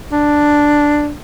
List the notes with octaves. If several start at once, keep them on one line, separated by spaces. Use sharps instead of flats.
D4